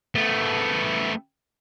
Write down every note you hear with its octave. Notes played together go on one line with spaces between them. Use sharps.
A3 B3